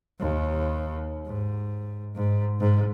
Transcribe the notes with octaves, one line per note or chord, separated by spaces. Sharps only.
D#2
G#2
G#2
G#2